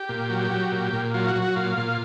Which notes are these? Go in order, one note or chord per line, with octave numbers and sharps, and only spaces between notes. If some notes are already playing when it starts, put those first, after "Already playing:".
Already playing: G4
A#2
F#3
F#3
A#2
A#2
F#3 F4
F#4
F#3
F#4
A#2 F4
A#2